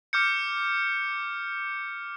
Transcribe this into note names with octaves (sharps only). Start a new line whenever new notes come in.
D6 F6 G6 C#7